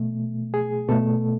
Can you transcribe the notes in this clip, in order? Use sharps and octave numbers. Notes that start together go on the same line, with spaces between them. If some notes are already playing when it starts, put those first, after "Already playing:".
Already playing: B2 A3
G#4
B2 A3 A4